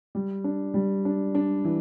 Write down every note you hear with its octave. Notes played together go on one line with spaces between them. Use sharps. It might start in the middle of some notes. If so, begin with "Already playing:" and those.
G3
D4
G3
D4
D4
E3